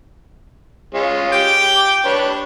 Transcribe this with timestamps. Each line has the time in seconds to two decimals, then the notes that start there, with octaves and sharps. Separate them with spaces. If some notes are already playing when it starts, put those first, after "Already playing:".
0.95 G#3 C#4 F4
1.32 G4 G5
1.76 D6
2.05 D4 B4 C#5